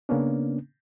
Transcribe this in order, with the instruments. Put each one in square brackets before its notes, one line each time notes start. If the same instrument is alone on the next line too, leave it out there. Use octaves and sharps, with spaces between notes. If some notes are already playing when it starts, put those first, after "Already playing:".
[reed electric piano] C#3 A#3 B3 C#4 D4